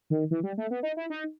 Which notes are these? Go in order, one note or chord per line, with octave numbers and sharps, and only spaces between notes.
D#3
E3
G3
A3
B3
D#4
E4
D#4